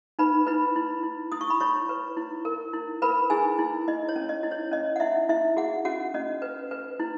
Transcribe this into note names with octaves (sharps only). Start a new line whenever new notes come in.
D#4 B4 B5
E4 B4 B5
E4
E4
E4 D#6
C#6
B5
E4 C#5 C#6
B4
E4
A#4
E4
A#4 B4 B5
E4 G#4 G#5
E4
E4 D#5
C#5
C#4
D#5
E4
C#5
C#4 D#5
F#5
E4 E5
E4 E5
F#4 G#4 F#5
C#4 F#4 F#5
C#4 D#5
B4
B4
E4